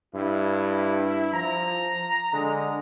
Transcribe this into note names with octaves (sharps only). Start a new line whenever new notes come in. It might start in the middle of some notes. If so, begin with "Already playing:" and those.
G2 E4
F3 A#5
D3 G#3